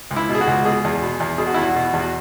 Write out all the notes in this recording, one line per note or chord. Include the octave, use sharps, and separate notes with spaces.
C#2
E4
B2
G#4
F#4
C#2
B2 G#4
E2
B2
E2
B2 G#4
F#4
E2 E4
F#4
B2
E2
F#4